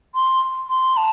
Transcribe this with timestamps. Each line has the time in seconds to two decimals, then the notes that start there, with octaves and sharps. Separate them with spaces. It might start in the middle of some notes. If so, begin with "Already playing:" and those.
0.15 C6
0.69 C6
0.97 A5